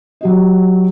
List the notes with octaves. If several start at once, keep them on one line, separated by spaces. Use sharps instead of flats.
F#3 G4 D#5